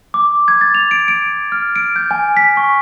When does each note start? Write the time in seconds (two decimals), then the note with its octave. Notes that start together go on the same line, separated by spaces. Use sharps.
0.14 D6
0.48 G#6
0.61 A6
0.75 F7
0.91 D7
1.08 D7
1.52 F6
1.76 D7
1.96 G6
2.11 G#5
2.37 B6
2.57 C#6